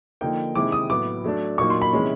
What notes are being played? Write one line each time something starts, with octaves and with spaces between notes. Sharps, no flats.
D3 F3 A#3 D#4 G5
C3 D#3 G#3 C4 E4 D6
D#6
A2 F#3 B3 D6
F#3 A3 D4
A#2 F#3 A#3 D#4 C#6
C6
B5
C3 E3 G#3 C#4